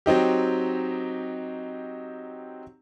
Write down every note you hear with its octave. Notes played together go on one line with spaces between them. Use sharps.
F#3 C4 D#4 G4